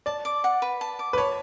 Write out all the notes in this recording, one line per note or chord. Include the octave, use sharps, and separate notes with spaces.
D5 A5
D6
F#5
B4
A5
D6
B4
C#5 A5